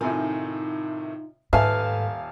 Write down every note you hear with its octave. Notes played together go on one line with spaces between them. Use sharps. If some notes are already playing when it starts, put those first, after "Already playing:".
A2 C3 D#3 D#4 F4 G#5
D#1 G#2 A4 B4 E5 F5 G#5 A5